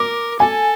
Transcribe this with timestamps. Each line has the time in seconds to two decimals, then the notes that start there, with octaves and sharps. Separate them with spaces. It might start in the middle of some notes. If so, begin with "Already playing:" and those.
Already playing: A#4 D6
0.40 A4 G#5